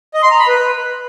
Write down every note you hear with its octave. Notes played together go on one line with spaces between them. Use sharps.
D#5
C6
A#5
B5
B4